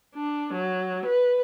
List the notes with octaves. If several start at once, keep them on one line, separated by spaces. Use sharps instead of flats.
D4
F#3
B4